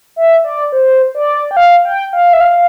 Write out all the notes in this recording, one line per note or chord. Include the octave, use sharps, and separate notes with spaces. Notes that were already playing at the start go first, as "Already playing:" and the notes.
E5
D5
C5
D5
G5
F5
G5
F5
E5
F5